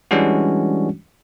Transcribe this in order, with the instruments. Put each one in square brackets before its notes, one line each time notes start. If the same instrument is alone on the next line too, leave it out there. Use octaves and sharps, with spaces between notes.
[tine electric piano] E3 G3 G#3 C#4 D4 F#4